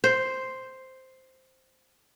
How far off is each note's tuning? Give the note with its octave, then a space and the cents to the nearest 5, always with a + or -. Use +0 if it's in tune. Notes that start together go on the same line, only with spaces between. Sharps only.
C5 +0